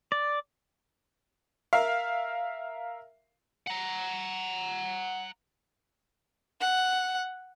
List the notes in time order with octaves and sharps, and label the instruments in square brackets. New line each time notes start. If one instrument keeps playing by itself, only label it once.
[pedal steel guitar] D5
[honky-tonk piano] A#4 E5 F5
[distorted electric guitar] F#5 A#5
[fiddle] F#5